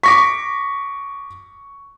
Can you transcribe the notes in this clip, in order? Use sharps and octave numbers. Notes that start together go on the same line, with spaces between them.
C#6 D6 A#6 B6